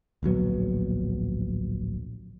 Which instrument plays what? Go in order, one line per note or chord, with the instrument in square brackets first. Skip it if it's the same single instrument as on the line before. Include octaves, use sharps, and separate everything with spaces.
[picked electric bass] D1 A#1 F#3 B3